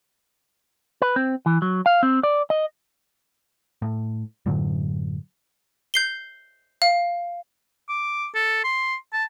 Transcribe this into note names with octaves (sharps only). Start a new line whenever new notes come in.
B4
C4
E3
F#3
F5
C4
D5
D#5
A2
F#2 A2 D3 F#3
G6 C7 G7
F5
D6
A4
C6
A5